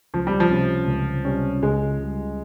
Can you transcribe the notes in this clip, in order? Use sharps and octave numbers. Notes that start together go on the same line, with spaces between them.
C#2 F3
G3
F3
C3 G3 C#4
C#2
C3 G3 C#4
C#2 G#3
C#3 G3